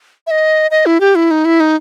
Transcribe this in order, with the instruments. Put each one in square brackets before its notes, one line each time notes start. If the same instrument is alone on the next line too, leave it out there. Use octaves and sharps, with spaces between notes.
[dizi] E5
D#5
D#5
E4
G4
E4
D#4
E4
D#4